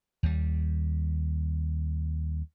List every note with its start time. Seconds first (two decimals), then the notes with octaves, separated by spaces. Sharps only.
0.23 D#2 G3